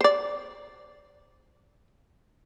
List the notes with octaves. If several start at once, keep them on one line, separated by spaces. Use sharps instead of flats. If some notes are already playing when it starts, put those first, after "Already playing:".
C5 D5